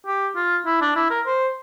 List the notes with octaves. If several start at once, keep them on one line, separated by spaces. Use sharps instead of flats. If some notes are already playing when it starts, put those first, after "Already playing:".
G4
F4
E4
D4
E4
A#4
C5